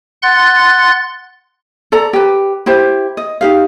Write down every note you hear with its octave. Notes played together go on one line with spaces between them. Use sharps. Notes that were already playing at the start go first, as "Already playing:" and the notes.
F#5 C6 F#6 A6
A4 D5 A#5
G4 B4
E4 G4 C5
D#5
D#4 G4 F5